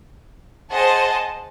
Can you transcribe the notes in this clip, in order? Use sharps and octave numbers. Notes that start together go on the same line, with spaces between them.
G#4 C5 D#5 F#5 A5